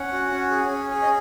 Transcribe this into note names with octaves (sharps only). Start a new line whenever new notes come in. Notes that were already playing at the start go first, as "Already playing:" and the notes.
Already playing: C#4 F#5
F#4
C#4
G#4
C#4
G#4
D#5